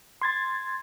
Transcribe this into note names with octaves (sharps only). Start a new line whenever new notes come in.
C6 G#6 A6